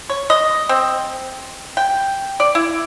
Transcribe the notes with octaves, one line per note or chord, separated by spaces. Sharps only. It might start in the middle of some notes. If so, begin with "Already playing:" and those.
C#5
D#5
C4
G5
D5
E4